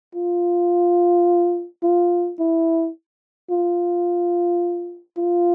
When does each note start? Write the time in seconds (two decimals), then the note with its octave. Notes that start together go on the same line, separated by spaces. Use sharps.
0.15 F4
1.83 F4
2.39 E4
3.50 F4
5.18 F4